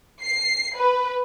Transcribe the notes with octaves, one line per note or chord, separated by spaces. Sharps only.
C7
B4